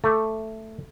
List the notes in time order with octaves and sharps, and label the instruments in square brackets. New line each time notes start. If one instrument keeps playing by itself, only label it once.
[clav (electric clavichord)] A3 [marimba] A4 D6 E6